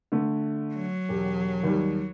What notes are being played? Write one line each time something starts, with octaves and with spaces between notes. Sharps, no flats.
D3 A3
F#3
E1 G4
D#2 G3